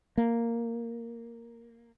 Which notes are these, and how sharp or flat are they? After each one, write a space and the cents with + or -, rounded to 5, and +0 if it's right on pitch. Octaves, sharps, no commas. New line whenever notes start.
A#3 -5